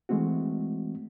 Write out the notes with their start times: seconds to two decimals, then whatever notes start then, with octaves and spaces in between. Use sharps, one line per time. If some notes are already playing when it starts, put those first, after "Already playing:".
0.09 E3 G#3 A3 C4 F#4